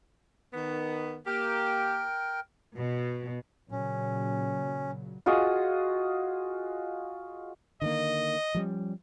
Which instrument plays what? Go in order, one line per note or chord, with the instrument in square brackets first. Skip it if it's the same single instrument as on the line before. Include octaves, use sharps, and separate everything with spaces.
[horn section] D#3 B3
[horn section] A#3 G4 [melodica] A#4 G5
[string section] B2
[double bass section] A#2 C#3 F#3 [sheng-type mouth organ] C#4
[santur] F4 F#4 G#4 D#5
[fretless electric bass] D3 D#3 A#3 [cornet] D#5
[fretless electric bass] F3 G3 C#4